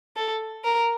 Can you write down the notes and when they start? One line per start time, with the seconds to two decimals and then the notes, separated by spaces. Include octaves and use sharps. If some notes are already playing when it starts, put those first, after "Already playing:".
0.16 A4
0.64 A#4